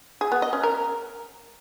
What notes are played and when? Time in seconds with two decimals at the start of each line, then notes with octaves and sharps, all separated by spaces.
0.21 G#4
0.32 B3
0.42 D#5
0.53 C#4
0.63 A#4